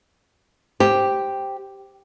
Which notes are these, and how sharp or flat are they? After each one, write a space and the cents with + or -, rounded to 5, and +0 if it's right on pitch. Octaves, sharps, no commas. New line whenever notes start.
G4 +0 C5 +0